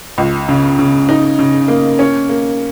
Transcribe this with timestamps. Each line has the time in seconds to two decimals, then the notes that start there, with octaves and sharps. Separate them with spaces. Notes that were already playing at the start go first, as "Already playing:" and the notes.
0.18 C#2
0.49 C#3
0.79 C#3
1.09 D#4
1.39 C#3
1.68 A#3
1.99 C#4
2.29 A#3